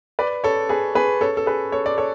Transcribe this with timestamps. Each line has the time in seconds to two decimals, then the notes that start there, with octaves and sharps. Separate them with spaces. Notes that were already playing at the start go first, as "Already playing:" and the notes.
0.19 B4 D5
0.44 A4 C#5
0.69 G#4 B4
0.95 G#4 B4
1.21 A4 C#5
1.37 A4
1.46 G#4 B4
1.72 A4 C#5
1.86 D5
1.98 A4 C#5